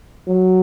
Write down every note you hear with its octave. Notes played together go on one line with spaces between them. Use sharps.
F#3